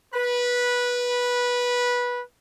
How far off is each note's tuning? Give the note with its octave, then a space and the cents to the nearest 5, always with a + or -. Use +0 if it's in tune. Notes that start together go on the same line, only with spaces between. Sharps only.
B4 -15